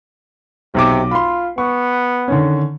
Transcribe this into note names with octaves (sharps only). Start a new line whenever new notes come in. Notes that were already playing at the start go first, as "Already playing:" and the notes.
B1 C3 D6
F4 B5 C6
B3 C#6
D3 D#3 C#4